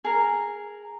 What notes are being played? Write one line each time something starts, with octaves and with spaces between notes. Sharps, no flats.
G#4 A#4